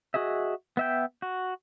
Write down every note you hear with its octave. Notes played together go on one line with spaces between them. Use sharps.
F#4 G#4 D#5 E5
B3 E5 G5
F#4